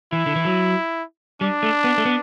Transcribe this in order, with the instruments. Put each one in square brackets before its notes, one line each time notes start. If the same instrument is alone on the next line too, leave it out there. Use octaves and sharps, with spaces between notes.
[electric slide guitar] E3 [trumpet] E4
[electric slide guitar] D3
E3
F#3
[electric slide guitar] G3 [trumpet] D4
[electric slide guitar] A3
B3
A3
B3